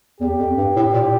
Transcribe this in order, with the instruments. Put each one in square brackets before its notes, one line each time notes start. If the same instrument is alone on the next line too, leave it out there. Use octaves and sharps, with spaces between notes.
[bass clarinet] E2 [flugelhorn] G4
[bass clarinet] F2
G2
A2
A#2